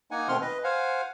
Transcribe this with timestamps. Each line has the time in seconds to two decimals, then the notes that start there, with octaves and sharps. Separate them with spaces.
0.11 A#3 D#4 F#5 G#5
0.28 B2 D#3 A3 C4 C6 F6
0.41 B4 D#5
0.64 C5 F5 F#5 G#5